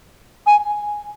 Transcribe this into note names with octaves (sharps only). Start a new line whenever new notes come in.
G#5